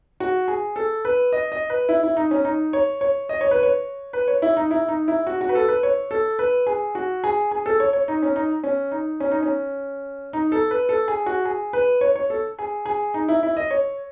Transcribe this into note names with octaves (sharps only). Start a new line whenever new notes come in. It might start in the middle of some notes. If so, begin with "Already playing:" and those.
F#4
G#4
A4
B4
D#5
D#5
B4
E4
E4
D#4
C#4
D#4
C#5
C#5
D#5
C#5
B4
C#5
B4
C#5
E4
D#4
E4
D#4
E4
F#4
F#4
B4
A4
B4
C#5
A4
B4
G#4
F#4
G#4
G#4
A4
C#5
C#5
D#4
C#4
D#4
C#4
D#4
C#4
D#4
C#4
D#4
A4
B4
A4
G#4
F#4
G#4
B4
C#5
C#5
A4
G#4
G#4
D#4
E4
E4
D#5
C#5